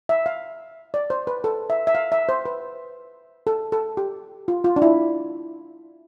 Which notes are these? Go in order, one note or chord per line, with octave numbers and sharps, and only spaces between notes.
E5
F5
D5
C5
B4
A4
E5
E5
F5
E5
C5
B4
A4
A4
G4
F4
F4
D4
E4